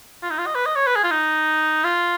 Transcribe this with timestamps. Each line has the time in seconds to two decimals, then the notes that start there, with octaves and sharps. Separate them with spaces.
0.23 F4
0.30 D#4
0.38 F4
0.46 D#5
0.55 B4
0.66 D#5
0.76 C#5
0.87 B4
0.96 G#4
1.04 F4
1.11 D#4
1.84 F4